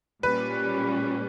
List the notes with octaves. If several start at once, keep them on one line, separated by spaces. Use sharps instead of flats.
A#2 G3 C#4 B4